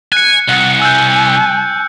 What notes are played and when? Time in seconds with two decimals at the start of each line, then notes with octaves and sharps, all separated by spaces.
0.12 G#5 F#6 C#7
0.49 C2 F#5 F#6 C#7
0.82 G#5 E6 F#6 G6